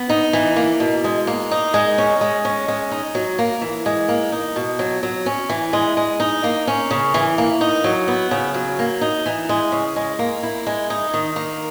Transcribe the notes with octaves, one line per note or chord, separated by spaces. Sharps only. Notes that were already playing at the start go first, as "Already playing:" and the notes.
Already playing: B3
D#4
E3
A#3
B2
G#3
A#3
D#4
G#3
C#4
G#3
C#4
G#3
D#4
F#3
A#3
E3
G#3
A#3
D#4
B2
F#3
F#3
C#4
E3
G#3
G#3
D#4
A#3
C#4
C#3
E3
A#3
D#4
F#3
B3
C#3
F#3
A#3
D#4
E3
G#3
C#3
G#3
A#3
E4
G#3
D#4
D#3
A#3